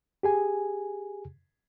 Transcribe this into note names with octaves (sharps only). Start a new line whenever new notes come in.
G4 G#4 G#5